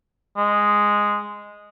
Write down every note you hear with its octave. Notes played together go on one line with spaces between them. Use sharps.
G#3